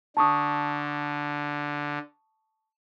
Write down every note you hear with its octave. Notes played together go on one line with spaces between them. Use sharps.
D3 A5 C#6 D#6